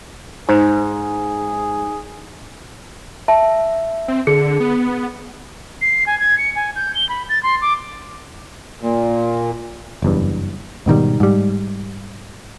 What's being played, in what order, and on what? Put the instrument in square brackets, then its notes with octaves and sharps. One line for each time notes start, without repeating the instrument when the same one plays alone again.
[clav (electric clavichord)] G#2 [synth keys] D#4 [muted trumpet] G#4 [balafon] C5
[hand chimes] E5 [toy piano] A5
[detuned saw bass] C4
[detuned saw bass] D3 [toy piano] G#4 [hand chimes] C#7
[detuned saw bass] B3
[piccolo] C7
G#5
G#6
C#7
G#5
G6
G7
B5
A6
C6
D6
[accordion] A#2
[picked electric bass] F#1 E2 G2
G#2 B2 D#3 G3
G#2 G3